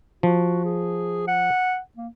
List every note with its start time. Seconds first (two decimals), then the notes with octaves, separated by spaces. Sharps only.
0.23 F3 F#4
0.65 G#4
1.28 F#5
1.97 A#3